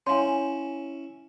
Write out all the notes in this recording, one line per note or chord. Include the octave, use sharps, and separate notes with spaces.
C#4 E4 C#5 F5 G#5 C6